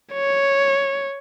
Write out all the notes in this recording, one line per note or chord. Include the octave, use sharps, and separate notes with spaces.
C#5